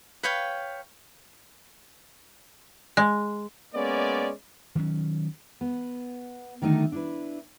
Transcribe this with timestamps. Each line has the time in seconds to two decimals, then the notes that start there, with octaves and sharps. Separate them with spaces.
0.23 B4 C#5 F5 G5
2.97 G#3
3.74 G#3 A#3 B3 C#4 D5
4.75 D#3 F#3 C#4
5.61 B3
6.62 D3 D#3 F#3 A3 D4 D#4
6.92 D4 E4 B4